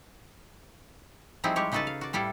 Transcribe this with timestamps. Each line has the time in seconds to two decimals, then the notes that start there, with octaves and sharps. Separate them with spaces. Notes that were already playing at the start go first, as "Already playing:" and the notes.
1.44 F3 G3 C4 D#4 E4 G#4
1.56 G3 G#3 G4 C#5
1.72 C#3 D#4 F#4 A4 B4 A5
1.87 F5
2.01 F#4 D5
2.13 A2 G3 E4 A4 F5